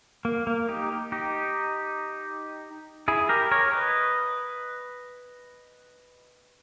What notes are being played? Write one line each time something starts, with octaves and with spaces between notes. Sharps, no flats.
A#3
A#3
D#4 G4
D#4 G4
E4 G#4
G4 A#4
A#4 C#5
B4 D#5